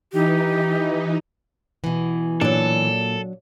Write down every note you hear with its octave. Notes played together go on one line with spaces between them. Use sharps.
E3 D#4 G4
B2 E3
A#2 F#3 D4 A4